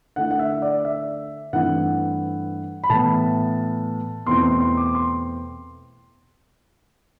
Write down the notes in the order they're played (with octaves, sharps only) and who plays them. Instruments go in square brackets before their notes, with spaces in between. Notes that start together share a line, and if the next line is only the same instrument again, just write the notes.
[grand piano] D3 A3 E4 F#5
F#5
E5
D5
E5
G2 E3 A3 C4 E4 F#5
B5
A2 E3 B3 A5
E2 B2 A3 C4 E4 C6
C6
C6
D6
C6